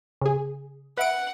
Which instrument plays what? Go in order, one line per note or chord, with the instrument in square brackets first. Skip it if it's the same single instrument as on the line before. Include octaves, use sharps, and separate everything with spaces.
[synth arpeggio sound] C#3 G#4
[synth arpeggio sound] B4 E5 D7 [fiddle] F#5